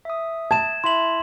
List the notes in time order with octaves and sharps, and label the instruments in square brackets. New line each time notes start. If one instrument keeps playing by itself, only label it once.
[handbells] E5 D#6
[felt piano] A5 [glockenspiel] G#6 E7
[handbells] E4 E5 [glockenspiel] C6 F#7